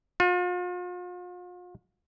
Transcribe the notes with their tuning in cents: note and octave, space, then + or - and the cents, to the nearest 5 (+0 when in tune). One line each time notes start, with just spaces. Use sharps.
F4 +40